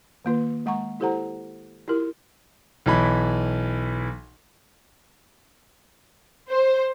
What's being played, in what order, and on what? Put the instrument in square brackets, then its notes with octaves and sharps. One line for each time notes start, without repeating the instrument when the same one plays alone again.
[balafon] D#3 A#3 F4 B4
G#3 F#5 A#5 C#6
E4 G4 A4 C5 F#5 A#5
E4 F4 G4 A#4
[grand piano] B1 E3 B5
[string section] C5